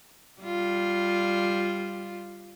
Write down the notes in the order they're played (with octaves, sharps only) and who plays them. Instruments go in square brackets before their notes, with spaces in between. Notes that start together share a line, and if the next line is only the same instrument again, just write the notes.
[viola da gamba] G3 F4